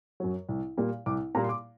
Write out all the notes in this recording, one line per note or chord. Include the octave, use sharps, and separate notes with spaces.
F#2 F#3
C2
A#2 G3 A#3
C2 D6
A#2 G3 A#3 A#5
C6
D6